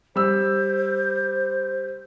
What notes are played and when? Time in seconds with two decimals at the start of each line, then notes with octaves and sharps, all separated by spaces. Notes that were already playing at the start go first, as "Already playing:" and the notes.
0.16 G3 C5 E6